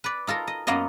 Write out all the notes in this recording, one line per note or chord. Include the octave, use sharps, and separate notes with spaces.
B4 D5
D#4 F4 A4 A#4
D#5
F#2 A#3 B3 F4 D#5